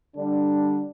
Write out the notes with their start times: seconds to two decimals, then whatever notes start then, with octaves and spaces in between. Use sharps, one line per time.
0.17 D3 G3 D4